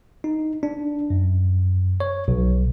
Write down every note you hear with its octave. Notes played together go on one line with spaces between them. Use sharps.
D#4
D4
F#2
C#5
B1